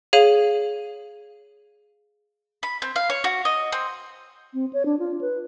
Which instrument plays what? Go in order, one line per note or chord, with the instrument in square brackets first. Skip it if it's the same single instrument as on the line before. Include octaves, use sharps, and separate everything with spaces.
[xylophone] G#4 C#5 F5 D#7 F#7
[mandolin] B5
C4
F5
C#5
F#4
D#5
C4
[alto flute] C4
C#5
D4
F4
B4